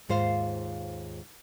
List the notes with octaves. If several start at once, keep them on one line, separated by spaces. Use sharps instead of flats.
D#2 G#2 F4 C5 F5